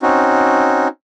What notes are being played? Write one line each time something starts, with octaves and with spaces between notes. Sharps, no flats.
C4 C#4 D#4 F#4